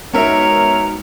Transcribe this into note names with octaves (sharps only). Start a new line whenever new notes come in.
G#3 B3 D#4 F#4 A#4 C#5 E5 A#5